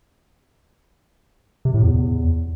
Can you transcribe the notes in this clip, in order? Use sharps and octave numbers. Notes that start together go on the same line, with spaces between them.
C3
A2
E2